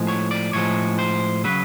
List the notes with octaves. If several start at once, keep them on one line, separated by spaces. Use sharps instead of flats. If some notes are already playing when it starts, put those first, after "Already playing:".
Already playing: A2 F3 G#3
C#5
D5
A2 F3 G#3 C#5
C5
C#3 F#3 B4